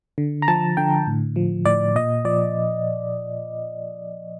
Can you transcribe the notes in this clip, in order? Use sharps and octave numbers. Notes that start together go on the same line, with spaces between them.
D3
A#5
F3 A5
D3 G5
A2
F3
A2 D5
A#2 D#5
F3 D5